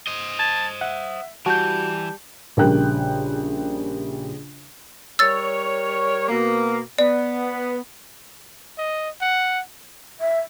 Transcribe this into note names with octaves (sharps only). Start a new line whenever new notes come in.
C5 D#5
A5 G#6
E5 F#5
E3 G3 F#4 A5 G6
A#1 C#3 G3 A#4 G5 F#6
G3 A#4 C#5 E6 A6
B2 A#3
B3 D5
D#5
F#5
E5